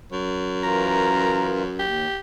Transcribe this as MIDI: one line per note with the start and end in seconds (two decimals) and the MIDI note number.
0.12 1.87 42
0.63 1.63 52
0.63 1.63 65
0.63 1.63 70
0.63 1.48 82
1.79 2.07 39
1.79 2.18 67